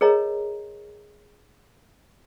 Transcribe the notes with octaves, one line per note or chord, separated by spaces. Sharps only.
G#4 A#4 C#5 D#5 A#5